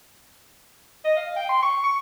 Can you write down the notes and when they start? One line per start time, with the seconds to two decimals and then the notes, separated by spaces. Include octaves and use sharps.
1.05 D#5
1.17 F5
1.36 G5
1.49 C6
1.62 C#6
1.84 C#6